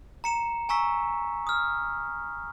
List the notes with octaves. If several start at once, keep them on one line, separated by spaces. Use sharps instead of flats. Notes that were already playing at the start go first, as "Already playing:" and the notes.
A#5 C#7 E7
G#5 A#5 C#6 E6 B6
D#6 F6